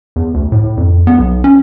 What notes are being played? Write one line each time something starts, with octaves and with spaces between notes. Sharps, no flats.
E2
D2
A2
F2
B3
B1
C#4